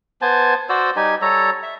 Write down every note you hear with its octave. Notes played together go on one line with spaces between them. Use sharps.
B3 C5 G#5 A5
F#4 C5 D5 E6
G3 D#4 G4 G#5
G3 A4 C#5 A#5
E5